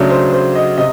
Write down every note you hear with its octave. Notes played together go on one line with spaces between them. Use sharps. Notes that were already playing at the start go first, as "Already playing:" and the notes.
Already playing: C#3 F#3 A3 D4
C5
C5
D#5
C3 D#5